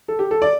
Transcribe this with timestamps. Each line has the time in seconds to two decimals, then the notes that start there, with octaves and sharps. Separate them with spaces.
0.08 A4
0.19 G4
0.31 A4
0.42 D5